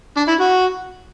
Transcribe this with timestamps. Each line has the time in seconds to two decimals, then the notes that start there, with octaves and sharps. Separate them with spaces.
0.17 D4
0.28 E4
0.40 F#4